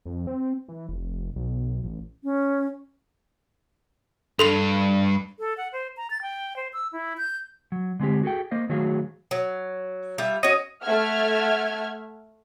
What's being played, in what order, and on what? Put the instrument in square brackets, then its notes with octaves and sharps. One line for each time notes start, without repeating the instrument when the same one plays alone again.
[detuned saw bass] F2
C4
E3
F1
B1
A1
[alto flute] C#4
[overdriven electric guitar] G2 [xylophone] A4 C6 F7
[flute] A4
F#5
C5
A#5
A6
G5
C5
E6
E4
G6
[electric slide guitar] F#3
D3 G#3 C4 G4
F#4 G#4 A4 G5
A#3 C5 D#5 F5
D#3 F#3 A3 F#4 G#4 F5
[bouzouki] F#3
G3 F4 E5
[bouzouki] C#4 F#4 [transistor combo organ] D#5
[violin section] A3 E5 F#5 F6 G#6